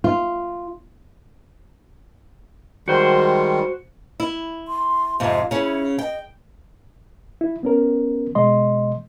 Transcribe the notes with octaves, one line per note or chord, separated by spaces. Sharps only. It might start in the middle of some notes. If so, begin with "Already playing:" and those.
F4
D#3 G3 G#3 F#4 C5
E4
C6
F2 G#2 C3 F5
C#3 C#4 E4
D#5 G5
E4
B3 C#4 A#4
B2 G#3 D#5 C6